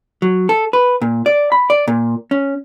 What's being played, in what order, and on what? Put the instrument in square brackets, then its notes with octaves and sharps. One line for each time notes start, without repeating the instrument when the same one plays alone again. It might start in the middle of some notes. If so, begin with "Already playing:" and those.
[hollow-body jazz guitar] F#3
A4
B4
A#2
D5
B5
D5
A#2
C#4